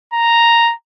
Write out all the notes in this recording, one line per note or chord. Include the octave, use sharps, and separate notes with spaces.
A#5